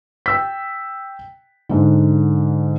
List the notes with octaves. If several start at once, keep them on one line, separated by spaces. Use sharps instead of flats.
G5 E6 B6
G#2 D3